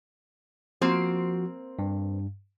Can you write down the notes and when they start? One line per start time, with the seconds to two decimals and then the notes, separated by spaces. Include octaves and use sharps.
0.82 F3 A#3 C4 F#4 C5
1.79 G2